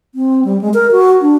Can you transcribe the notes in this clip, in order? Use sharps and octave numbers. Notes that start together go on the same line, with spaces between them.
C4
G3
G#3
A#4
F#4
D4